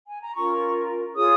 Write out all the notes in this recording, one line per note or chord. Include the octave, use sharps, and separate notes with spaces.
G#5
A#5
C#4 F4 A#4 C#6
F4 G#4 C#5 D#6